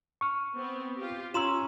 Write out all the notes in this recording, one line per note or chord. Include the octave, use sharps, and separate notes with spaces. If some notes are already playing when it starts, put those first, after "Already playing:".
C#6 F6
B3 C4
F4 G4
C#4 F4 A#5 C6 E6 E7